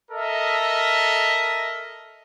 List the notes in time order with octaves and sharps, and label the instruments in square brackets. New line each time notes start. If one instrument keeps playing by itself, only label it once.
[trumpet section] A4 A#4 D#5 E5